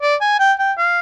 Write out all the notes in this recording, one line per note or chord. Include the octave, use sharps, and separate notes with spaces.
D5
G#5
G5
G5
F5